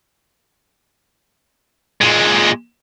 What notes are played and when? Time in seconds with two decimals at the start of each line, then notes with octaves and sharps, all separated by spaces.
2.01 A#2 G#3